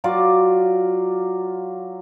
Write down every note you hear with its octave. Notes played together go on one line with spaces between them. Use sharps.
F#3 F4 D5 D6